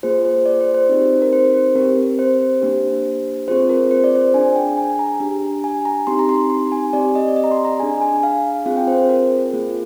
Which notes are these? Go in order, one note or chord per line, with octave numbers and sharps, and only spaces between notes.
A#3 F4 G#4 C5
C5
D5
C5
C5
C4 D#4 G4
A#4
C5
C5
C4 G4 A#4
C5
A#3 D4 G4
C4 F4 G#4 C5
A#4
C5
D5
C5
D4 G#4 G#5
G5
G#5
A#5
D4 G4
G#5
A#5
C4 D#4 G4 C6
A#5
C6
C6
G#5
C4 G4 D5
D#5
D5
D#5
A#5
C6
A#5
D4 G#4 G#5
G#5
F5
C4 F4 G#4 F5
G5
C5
C5
A#4
A#3 F4 G#4